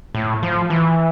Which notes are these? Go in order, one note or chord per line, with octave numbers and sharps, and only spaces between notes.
A2
F3
E3